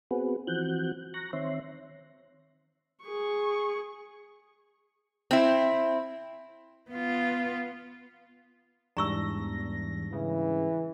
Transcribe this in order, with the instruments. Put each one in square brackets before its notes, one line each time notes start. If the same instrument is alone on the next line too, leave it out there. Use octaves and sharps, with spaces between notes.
[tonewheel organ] B3 C4 F#4 G#4 B4
E3 F3 C4 F#4 F#6 G6
A#5 C#6 F#6 A#6
D#3 C4 C#5 E5 C6
[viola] G#4 C#6
[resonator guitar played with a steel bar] C4 E4
[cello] B3 F4
[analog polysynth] E2 A#6 [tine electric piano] G#2 G3 D4 [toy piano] A#5 C#6 E6
[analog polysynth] C#3 [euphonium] E3